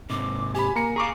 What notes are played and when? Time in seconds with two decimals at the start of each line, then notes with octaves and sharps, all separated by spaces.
0.10 G#2 C3 D6
0.55 G4 G#5 B5
0.76 A#3 G#5 A#5 C#7
0.96 G#4 F5 A#5 C#6 D6